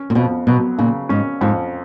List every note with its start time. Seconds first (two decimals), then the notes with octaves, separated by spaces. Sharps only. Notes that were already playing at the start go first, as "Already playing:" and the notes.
Already playing: C#4
0.10 A#2
0.15 F2 B2
0.47 B2 F#3
0.78 A#2 C#3
1.09 G#2 C#4
1.41 F2 G#2